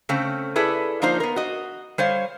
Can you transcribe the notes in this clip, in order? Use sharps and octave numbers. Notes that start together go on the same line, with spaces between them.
C#3 A3 C4 C#4
E4 G#4 A4 B4 D5
F3 A#3 D4 D#4 F4 C5
B3 A#4
F#4 D#5
G3 C5 C#5 F5